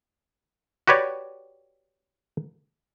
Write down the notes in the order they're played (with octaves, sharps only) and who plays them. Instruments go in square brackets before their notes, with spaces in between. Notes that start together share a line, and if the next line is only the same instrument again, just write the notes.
[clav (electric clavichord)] F#4 G4 B4 C#5 D5